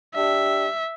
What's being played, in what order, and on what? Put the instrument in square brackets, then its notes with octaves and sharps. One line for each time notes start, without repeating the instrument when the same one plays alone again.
[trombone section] D4 G4 [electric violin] E5